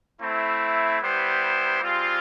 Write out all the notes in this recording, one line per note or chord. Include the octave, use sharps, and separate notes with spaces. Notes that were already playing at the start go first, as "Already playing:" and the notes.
A3 C4 E4
G3 B3 E4 G4 C5
G3 C4 F4 G#4